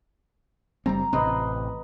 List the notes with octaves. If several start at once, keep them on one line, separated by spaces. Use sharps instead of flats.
F#1 G3 C4 A#5
A1 C3 C4 B4 D#5